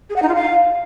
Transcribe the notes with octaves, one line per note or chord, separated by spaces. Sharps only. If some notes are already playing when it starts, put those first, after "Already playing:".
G#4
F#5
D#4
F4
F5